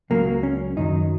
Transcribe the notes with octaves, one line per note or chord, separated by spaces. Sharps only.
C#2 C#3 F#3 A#3
C#4
F#2 D#3 F#3 D#4